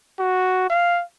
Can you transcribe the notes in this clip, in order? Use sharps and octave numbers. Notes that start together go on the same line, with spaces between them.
F#4
F5